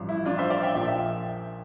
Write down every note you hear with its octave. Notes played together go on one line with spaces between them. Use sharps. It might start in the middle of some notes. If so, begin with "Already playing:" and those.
Already playing: A1 G2 F3
E4
D4 F4
C5 E5
D5 F5
E5 G5
A#1 A#2 F3 E5 G5
E5 G5